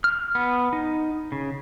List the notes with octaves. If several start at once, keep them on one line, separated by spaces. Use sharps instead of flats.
F6
B3
D#4
C#3